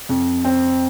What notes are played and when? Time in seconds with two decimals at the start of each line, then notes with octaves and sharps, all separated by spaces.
0.09 F2
0.45 C4